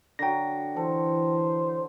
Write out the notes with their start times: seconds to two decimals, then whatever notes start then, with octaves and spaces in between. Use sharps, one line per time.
0.19 D3 F#3 G5 A#6
0.76 E3 A4 C5